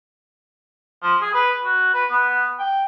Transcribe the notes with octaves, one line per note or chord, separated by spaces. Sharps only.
F3
G#4
B4
F#4
B4
B3
G5